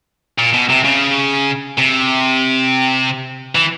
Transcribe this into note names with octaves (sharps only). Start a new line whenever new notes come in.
A#2
B2
C3
C#3
C3
E3